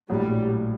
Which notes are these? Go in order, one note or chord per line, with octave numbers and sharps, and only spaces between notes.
A#1 A2 F#3 G3